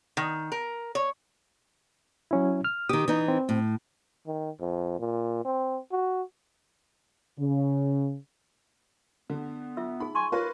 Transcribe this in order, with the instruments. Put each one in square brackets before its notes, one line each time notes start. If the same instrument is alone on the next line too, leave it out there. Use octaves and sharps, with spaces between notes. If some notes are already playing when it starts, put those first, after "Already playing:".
[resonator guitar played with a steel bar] D#3
A#4
C#5
[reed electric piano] F#3 C#4 E4
F6
[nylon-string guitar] D#3 G4 [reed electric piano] D#6
[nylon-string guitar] E3 D#4
[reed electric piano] C4
[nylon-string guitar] A2
[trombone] D#3
F2
A#2
C4
F#4
[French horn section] C#3
[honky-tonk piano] D3 [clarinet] B3
[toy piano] F4 E5 E6
[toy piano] D#4 G#4 [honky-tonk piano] B5
[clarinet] G#5 [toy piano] C6 C#6
[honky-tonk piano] F4 B4 C#5 [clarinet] A#4